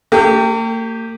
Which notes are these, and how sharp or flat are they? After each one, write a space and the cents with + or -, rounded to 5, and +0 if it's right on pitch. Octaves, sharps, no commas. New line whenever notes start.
A#3 -45 G4 +0